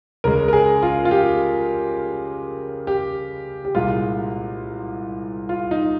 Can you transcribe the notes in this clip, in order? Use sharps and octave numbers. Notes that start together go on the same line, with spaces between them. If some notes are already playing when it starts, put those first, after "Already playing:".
C#2 C#3 G#3 A#4
A#4
G#4
F4
F4
G4
G4
G4
C2 A#2 G#3 F4
F4
D#4